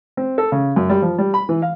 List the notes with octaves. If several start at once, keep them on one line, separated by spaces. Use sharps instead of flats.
C4
A4
C#3
F#2
G3
F3
G3
B5
E3
F5